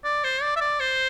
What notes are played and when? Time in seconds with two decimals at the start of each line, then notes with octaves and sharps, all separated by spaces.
0.04 D5
0.24 C5
0.42 D5
0.56 E5
0.61 D5
0.80 C5